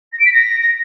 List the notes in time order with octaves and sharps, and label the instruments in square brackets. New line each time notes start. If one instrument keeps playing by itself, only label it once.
[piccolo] A#6
D7
B6
A#6